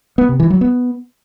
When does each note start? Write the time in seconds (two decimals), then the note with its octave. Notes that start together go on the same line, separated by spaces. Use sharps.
0.18 B3
0.29 C3
0.40 E3
0.50 F#3
0.61 B3